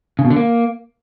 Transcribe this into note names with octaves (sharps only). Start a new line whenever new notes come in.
C#3
B2
D3
A#3